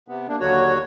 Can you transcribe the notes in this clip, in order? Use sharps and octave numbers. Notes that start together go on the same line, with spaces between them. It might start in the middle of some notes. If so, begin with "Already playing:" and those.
C3 B3
A#3 D4
D#2 D3 F#3 F#4 C#5